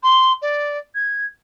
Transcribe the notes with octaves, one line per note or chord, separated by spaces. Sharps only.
C6
D5
G#6